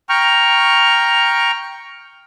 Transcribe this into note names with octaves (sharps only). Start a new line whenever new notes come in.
G5 A#5 C#6 F6